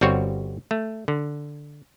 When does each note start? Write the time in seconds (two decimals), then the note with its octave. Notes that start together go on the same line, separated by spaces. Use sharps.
0.01 G1 G3 C4 F#4 C#5
0.71 A3
1.08 D3